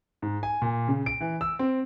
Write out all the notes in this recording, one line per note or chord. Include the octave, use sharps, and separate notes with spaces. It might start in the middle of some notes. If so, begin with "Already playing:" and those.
G#2
G#5
A#2
C#3
D7
E3
E6
C4